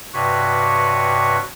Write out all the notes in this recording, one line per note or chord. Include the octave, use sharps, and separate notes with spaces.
G2 C3 F#4 B4 C#5 C#6